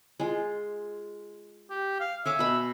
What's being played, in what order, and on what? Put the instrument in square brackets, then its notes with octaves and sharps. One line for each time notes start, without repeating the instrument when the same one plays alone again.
[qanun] G#3 F4
[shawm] G4
F5
[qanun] C#5 G#5 D6 [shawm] E5
[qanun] B2 B5